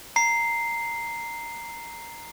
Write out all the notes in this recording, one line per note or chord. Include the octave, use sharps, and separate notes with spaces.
A#5 C7